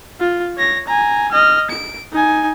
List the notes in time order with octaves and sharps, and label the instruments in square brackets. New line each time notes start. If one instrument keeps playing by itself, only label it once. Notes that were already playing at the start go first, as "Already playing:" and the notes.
[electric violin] F4
C#5 A#6
G#5 A#5
D#5 F6
D7
D#4 G#5